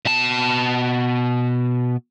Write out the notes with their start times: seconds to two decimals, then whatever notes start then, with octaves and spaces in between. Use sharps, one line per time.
0.06 B2 A5